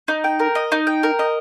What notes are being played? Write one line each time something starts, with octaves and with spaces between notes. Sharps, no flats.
D#4
G5
A#4
D#5
D#4
G5
A#4
D#5